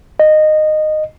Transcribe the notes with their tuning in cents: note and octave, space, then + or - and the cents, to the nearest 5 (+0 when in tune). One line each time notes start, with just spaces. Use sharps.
D#5 -15